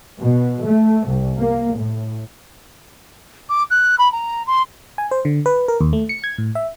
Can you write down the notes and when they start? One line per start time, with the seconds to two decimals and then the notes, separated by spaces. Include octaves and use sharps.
0.20 B2
0.65 A3
1.07 C2
1.38 A#3
1.78 A2
3.49 D6
3.70 F#6
3.98 B5
4.12 A#5
4.47 C6
4.98 G#5
5.11 C5
5.25 D3
5.46 B4
5.68 A#4
5.81 D#2
5.93 A3
6.09 C#7
6.24 G#6
6.38 A2
6.55 E5